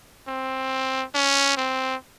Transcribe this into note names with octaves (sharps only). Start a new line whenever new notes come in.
C4
C#4
C4